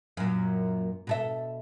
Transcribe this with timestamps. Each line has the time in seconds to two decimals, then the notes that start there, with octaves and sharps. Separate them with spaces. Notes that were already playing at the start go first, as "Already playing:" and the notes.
0.17 F#2 A#2
1.07 B2 A4 E5